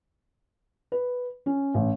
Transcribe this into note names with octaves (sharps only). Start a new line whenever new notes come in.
B4
C#4
A1